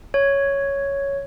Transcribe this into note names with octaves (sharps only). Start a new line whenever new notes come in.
C#5